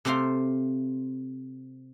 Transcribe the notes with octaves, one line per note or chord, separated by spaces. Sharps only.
C3 A3 C4 C5 F5 C6